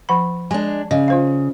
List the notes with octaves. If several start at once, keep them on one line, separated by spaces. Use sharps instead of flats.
F3 F#5 B5
G#3 D4 G#5
C#3 D#5
F4 C5 F5